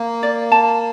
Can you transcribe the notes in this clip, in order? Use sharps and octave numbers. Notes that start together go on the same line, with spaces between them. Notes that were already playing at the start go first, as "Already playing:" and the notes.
Already playing: A#3
D5
A5